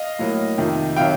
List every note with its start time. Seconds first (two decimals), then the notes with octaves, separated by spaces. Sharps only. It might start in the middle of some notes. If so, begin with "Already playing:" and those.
Already playing: D#5 F5
0.19 A2 F#3 A#3
0.58 F2 C3 D#3
0.96 C3 D#3 F#3 F5 G5